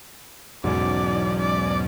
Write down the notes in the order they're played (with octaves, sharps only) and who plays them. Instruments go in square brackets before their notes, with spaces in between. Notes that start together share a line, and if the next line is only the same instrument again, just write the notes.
[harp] B1 [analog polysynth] E2 G#2 C#4 [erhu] D5
[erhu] D5